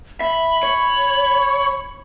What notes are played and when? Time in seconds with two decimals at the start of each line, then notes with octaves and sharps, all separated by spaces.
0.20 E5 B5
0.63 C#5